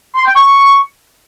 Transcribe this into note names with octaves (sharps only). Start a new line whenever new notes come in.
C6
G5
C#6